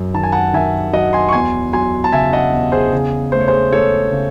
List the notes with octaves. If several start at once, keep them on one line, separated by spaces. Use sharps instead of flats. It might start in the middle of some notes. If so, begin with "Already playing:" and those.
Already playing: F#2
D#3 A5
G#5
F#5 A5
D#3 E5 G#5
F#3 D#5 F#5
G#5 C6
C#6
E2 G#5 C6
F#3 G#5 C6
A5
C#3 E5 G#5
D#5 F#5
E2
G#4 C5
C#3 G#4
A3 C5
C#5
G#4 C5
A3 A4 C#5
C#3